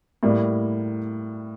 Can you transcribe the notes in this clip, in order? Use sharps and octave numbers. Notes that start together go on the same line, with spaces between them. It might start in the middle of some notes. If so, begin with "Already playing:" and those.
A2 G3 A#3